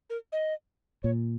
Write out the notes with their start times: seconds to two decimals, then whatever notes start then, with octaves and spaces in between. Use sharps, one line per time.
0.10 A#4
0.32 D#5
1.03 A#2 C#5